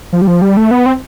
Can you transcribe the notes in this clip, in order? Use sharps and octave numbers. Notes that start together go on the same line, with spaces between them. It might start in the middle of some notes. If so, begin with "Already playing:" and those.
F3
G3
F3
G3
A3
B3
C4